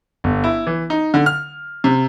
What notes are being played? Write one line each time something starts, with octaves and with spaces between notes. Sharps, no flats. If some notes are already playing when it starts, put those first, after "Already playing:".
G1
E4
E3
D#4
D3
F6
C3